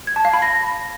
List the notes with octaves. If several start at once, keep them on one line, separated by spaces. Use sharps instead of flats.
G#6
A5
F5
B5
A#6